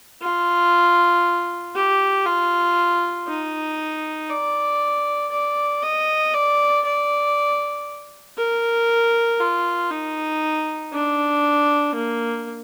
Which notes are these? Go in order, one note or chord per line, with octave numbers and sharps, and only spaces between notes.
F4
G4
F4
D#4
D5
D5
D#5
D5
D5
A#4
F4
D#4
D4
A#3